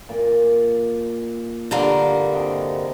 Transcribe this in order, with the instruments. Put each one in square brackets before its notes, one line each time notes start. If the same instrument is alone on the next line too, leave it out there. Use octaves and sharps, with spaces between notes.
[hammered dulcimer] A#2 D5 G#5
[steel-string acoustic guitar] G2 D3 A#3
[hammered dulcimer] C3 F#4 D#5